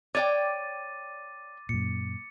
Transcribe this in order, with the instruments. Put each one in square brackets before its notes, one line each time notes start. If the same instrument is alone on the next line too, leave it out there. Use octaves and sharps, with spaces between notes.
[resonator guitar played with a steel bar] C#5 D5 G5 [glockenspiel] D6 A6 D#7
[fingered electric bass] F#2 A#2 [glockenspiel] C#7